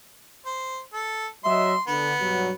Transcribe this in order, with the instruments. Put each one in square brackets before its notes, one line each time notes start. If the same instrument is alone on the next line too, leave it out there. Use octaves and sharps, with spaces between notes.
[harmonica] C5
A4
[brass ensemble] F#3 D#5 E5 [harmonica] C6
[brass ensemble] D3 [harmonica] B3
[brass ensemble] G2 B2 F#3